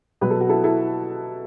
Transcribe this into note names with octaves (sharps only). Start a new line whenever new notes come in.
B2 F#3 B4
A4
F#4
E4 A4
E4 A4